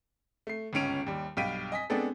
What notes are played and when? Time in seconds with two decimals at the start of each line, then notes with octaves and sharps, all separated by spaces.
0.47 A3 C7
0.73 G1 C#2 C#4 D7 F7
1.07 D#2 G3
1.37 B1 G2 F5 G5 B6 D#7
1.72 D#5 G#5 B6
1.90 G#3 B3 C4 D4 G#4 A4